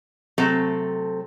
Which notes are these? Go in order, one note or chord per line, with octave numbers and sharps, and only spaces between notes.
C3 F#3 A3 C4 A4